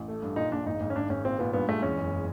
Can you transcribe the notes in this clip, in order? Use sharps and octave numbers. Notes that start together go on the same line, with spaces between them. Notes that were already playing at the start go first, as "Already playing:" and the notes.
Already playing: A1
A3
G2
A#2 D#4
A#1 D4
G#1 D#4
G#1
C#4
G#1 D4
G#1 C#4
A#2 C4
A#2 B3
G2 B3
G#3 A3
E2 C#4
F#1